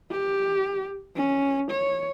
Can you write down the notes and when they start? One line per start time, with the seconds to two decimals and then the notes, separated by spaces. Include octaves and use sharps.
0.11 G4
1.16 C#4
1.71 C#5